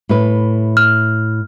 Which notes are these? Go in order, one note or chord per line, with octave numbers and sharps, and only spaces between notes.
A2 B4
F6